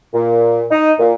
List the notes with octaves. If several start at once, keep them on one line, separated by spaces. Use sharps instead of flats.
A#2
D#4
A#2